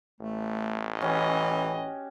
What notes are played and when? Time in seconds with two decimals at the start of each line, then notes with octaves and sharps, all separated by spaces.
0.20 A1 A3
1.01 E3 C#4 F#4 G4 D#5